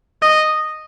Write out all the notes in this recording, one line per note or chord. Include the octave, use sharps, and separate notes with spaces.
D#5